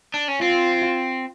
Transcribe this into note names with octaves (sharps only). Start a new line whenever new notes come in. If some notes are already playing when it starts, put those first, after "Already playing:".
D4
C#4
C4 F4